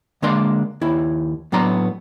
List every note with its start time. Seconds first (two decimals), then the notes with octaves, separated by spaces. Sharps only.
0.22 D3 G#3 A#3 D4 C6
0.81 D#2 E4
1.52 A2 F#3 B3 D4 A#5 C6